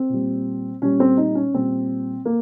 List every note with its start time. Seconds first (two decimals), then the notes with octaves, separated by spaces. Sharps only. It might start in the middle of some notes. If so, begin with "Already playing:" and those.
Already playing: C4
0.09 A#2 G3
0.81 A#2 G3 C#4
1.00 C4
1.17 D#4
1.35 C#4
1.54 A#2 G3 C4
2.25 A#3